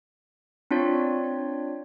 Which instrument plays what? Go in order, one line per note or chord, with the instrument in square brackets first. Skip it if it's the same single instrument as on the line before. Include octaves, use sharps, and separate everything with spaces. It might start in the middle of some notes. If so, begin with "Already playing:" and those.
[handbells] C4 D4 F4 C#5 D5